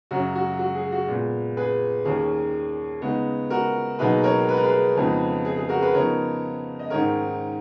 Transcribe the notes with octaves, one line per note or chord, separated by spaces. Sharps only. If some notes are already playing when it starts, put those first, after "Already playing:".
F#2 C#3 F#3 C#4 F#4
F#4
F#4
G#4
F#4
A#2 G#3 B3
G#4 B4
D#2 D#3 A#3 C#4 G#4
C#3 G#3 B3 D#4
F#4 A#4
B2 F#3 A#3 D#4 G#4 B4
A#4 C#5
B4
A#4
G#4 B4
F2 C#3 G#3 B3 D#4
G#4
G#4
F#4 A#4
G#4 B4
C#3 F3 B3 D#4 A#4 C#5
D#5
G#2 D#3 G#3 C#4 A#4 C#5